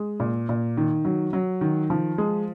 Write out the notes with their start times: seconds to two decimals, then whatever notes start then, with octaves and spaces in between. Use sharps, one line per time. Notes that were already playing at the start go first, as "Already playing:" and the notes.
Already playing: G#3
0.20 A#2
0.49 A#2
0.77 D#3
1.05 F#3
1.33 F#3
1.61 D#3
1.90 F3
2.18 G#3